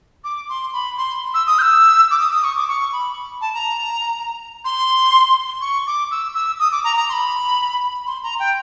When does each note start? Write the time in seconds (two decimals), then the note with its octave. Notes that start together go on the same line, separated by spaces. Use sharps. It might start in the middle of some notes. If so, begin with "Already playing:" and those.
0.24 D6
0.49 C6
0.73 B5
0.98 C6
1.34 E6
1.47 D#6
1.58 G6
1.62 E6
2.11 D6
2.19 D#6
2.33 D#6
2.44 C#6
2.56 D6
2.68 C#6
2.92 B5
3.41 A5
3.54 A#5
4.65 C6
5.61 C#6
5.87 D6
6.11 E6
6.35 E6
6.60 D#6
6.72 D6
6.84 A#5
6.97 A#5
7.09 C6
7.13 B5
8.06 C6
8.23 A#5
8.39 G5